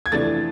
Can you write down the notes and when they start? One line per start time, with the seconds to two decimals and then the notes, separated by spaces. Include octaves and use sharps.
0.06 G#6
0.12 F2 C3 E3 A3 D4 A6